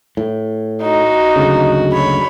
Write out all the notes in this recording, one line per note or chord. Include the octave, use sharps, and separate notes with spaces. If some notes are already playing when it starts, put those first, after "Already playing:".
A2
D#4 F#4
F#1 D2 C#3
C#5 B5